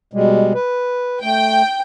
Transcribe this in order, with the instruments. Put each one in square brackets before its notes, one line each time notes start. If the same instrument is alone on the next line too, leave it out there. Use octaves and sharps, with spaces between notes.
[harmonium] B2 G3 G#3
B4
[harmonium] A3 [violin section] G5